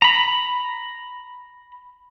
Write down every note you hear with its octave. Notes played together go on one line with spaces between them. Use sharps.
A#5 B5